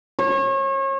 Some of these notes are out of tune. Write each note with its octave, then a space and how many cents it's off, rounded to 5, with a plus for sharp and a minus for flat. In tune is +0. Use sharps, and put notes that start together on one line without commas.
C#5 -35